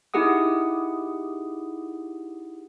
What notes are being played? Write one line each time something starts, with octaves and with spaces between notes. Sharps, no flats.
D#4 E4 G4 G#4 F#5 D#6